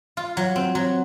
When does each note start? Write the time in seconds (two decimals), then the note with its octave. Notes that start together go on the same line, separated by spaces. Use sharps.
0.17 F4
0.37 F#3
0.56 C4
0.75 F#3